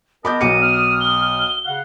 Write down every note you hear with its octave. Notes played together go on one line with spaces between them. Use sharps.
B3 A#4 D#5 A5 B5 D6 G6
B1 D6 C#7 D#7
D#6 F6
G7
C#3 F5 F#5